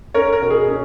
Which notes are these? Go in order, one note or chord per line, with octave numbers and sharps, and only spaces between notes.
C#4 A#4 C#5
A#4
B2
G#4
C#4